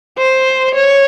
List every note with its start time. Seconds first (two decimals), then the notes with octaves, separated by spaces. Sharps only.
0.18 C5
0.75 C#5